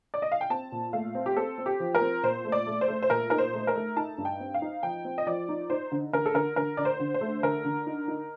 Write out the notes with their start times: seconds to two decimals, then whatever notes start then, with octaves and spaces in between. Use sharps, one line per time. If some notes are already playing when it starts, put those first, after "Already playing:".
0.14 D5
0.22 D#5
0.32 F5
0.41 G5
0.50 C4 A5
0.72 A#2
0.93 A3 F5
1.15 C4
1.26 G4
1.37 C4 A4
1.58 C4
1.66 G4
1.80 F3
1.95 A#4
2.01 C4
2.23 A#2 C5
2.45 A3
2.52 D5
2.67 A3
2.81 C5
2.88 A3
3.02 C5
3.10 A#2 A#4
3.30 D#4 A#4
3.38 C5
3.53 A3
3.67 A#4
3.75 A3
3.96 D#4 A5
4.18 G2
4.25 G5
4.40 C4
4.54 F5
4.62 D#4
4.83 F3 G5
5.05 C4
5.18 D#5
5.27 F3 D5
5.49 D#4
5.70 D#4 C5
5.92 D3
6.13 D3 A#4
6.26 A4
6.34 D3 A#4
6.56 D3 A#4
6.77 D3 D5
6.85 C5
7.00 D3
7.14 C5
7.21 A3
7.43 D3 A#4
7.65 D3
7.87 D#4
8.08 D#4